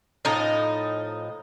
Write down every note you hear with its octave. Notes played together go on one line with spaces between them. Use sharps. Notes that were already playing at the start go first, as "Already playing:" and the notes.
A2 F3 D#4